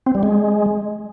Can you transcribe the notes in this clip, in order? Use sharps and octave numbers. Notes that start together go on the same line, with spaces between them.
C4
G3
G#3